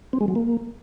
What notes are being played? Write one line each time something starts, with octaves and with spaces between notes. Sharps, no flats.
C4
G#3
F#3
A#3